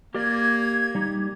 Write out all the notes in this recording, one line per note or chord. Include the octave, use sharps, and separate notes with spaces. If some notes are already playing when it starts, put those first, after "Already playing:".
A#3 G4 A#4 D5 G#6
G3 D#4 G4